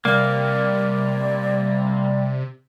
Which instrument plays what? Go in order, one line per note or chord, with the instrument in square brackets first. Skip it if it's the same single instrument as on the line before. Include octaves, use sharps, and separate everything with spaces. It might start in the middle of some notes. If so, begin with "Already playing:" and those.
[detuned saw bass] C3 [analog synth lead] G3 [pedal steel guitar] A#3 [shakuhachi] D5